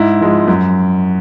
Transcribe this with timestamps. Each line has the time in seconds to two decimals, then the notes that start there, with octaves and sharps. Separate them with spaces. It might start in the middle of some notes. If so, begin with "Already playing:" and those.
Already playing: G#2 E4
0.21 F3 G#3
0.48 F#2